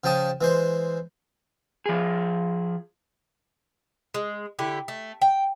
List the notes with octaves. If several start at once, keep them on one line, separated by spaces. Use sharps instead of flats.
C#3 F3 G5 A5 D#6
E3 G#3 C5
F3 G#4
G#3
D3 E4 G4
A3
G5